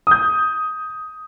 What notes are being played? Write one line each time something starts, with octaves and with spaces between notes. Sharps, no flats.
D#6 G6